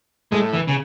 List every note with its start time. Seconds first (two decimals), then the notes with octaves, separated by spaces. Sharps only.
0.32 A2 G#3
0.54 E3
0.68 C#3